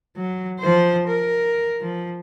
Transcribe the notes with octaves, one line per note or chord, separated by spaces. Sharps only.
F#3
F3 C5
A#4
F3